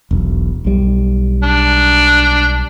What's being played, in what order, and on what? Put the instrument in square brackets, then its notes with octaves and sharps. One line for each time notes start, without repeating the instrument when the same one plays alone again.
[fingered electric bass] E1 B1
B1 G3
[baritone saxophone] D4